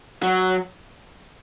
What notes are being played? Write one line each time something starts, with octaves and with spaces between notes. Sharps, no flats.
F#3